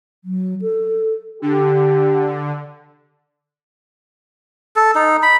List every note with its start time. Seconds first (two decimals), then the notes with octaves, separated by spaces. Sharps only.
0.25 F#3
0.62 A4
1.42 D3 G4
4.76 A4
4.95 D#4
5.23 B5